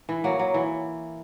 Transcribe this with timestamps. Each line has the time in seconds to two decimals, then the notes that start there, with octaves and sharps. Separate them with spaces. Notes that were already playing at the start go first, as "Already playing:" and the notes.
0.09 E3
0.24 F#3 A#3
0.39 F#3
0.54 E3